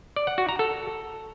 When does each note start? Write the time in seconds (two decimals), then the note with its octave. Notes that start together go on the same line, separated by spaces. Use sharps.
0.16 D5
0.27 F#5
0.38 F#4
0.49 A#5
0.59 A4